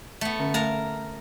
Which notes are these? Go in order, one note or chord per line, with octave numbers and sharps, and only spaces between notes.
A3 B3
D3 C#4 E5
A3 A#4 A5 A#5